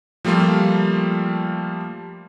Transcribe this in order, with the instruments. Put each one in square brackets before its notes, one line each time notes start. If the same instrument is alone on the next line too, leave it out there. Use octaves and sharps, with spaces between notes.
[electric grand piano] F3 G3 A3 A#3 F4